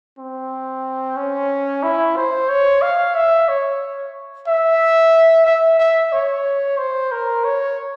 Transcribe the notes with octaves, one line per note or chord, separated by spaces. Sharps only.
C4
C#4
E4
C5
C#5
F5
E5
C#5
E5
E5
E5
C#5
C5
A#4
C#5